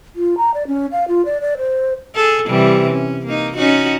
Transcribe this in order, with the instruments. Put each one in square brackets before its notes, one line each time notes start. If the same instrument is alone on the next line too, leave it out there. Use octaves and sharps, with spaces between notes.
[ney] F4
A#5
D5
C#4
F5
F4
D5
D5
C5
[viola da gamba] G#4 A4
C3 E3 G3
C#4
A#3 D#4
C#4 D#4 F#4